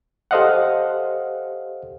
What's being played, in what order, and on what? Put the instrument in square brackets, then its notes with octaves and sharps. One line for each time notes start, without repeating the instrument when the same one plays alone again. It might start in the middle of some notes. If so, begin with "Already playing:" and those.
[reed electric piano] G4 A4 C5 D#5 F5 F#5